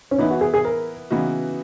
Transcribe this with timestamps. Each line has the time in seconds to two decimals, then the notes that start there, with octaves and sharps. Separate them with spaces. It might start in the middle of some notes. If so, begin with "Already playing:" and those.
0.11 C#4
0.18 E3 B3 D#4 E4
0.31 F#4
0.41 G#4
0.54 G#4
0.65 A#4
1.11 C#3 E3 B3 D#4 F#4